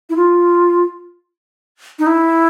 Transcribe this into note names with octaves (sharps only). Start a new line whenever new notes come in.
E4
F4
D#4
E4